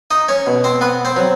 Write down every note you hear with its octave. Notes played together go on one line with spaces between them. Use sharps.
D#4 D#5
C#4 C#5
B2
C4 C5
B3 B4
C4 C5
F#3